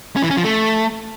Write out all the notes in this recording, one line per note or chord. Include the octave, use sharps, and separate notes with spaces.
C#4
E3
C#4
F3
A3